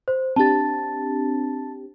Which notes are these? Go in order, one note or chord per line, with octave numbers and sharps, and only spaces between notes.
C5
C4 D4 G4 A5 A6